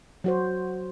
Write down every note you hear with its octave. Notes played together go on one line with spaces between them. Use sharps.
F#3 F#4 C5